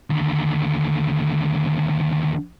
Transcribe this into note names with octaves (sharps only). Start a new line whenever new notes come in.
D#2 D3